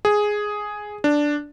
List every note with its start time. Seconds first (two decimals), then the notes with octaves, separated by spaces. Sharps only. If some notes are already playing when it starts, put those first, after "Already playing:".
0.05 G#4
1.04 D4